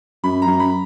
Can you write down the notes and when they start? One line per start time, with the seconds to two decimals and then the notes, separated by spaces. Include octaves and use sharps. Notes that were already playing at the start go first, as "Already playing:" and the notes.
0.24 F#2 B5
0.42 A#5
0.47 F#2
0.60 B5